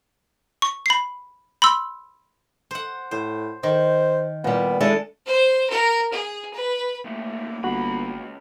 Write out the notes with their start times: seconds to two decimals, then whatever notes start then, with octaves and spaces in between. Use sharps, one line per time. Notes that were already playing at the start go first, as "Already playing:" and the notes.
0.62 C#6
0.86 B5 C7
1.62 B5 C6 E6
2.71 C5 F#5
3.11 A2 C5
3.63 D#3 C5
4.44 A#2 G3 B3
4.81 G#3 D4 E4 A4
5.26 C5
5.70 A#4
6.12 G#4
6.54 B4
7.05 B1 A3 A#3
7.64 G1 C#2 F#4 B5